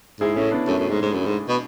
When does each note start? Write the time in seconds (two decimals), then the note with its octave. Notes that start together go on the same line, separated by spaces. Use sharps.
0.20 G#2 E4 G#4
0.36 A2 C#4 E4
0.51 B3 D4
0.67 F#2 A3 C#4
0.78 F#2
0.90 G#2
1.02 G#2
1.13 F#2
1.26 G#2
1.49 B2